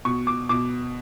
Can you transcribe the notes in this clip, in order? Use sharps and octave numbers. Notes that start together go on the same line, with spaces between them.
B2 C#6
D6
B2 D6